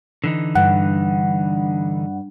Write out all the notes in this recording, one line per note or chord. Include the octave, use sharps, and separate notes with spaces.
D3 E3 D#4
G2 F#5